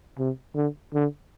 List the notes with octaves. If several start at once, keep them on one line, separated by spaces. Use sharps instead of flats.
C3
D3
D3